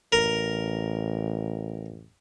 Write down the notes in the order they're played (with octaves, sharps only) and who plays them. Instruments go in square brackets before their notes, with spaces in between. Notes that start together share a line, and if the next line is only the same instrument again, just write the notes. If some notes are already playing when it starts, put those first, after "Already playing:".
[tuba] A1 [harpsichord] A#4